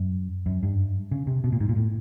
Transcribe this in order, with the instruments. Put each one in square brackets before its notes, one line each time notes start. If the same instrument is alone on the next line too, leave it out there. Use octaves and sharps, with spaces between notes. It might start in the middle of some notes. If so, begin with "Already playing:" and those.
Already playing: [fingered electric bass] F#2
F#2
G2
C#3
C3
B2
A#2
G#2
A#2
A2